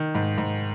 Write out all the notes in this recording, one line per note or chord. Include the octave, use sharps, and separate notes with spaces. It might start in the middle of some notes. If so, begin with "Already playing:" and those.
Already playing: D#3
G#2
G#2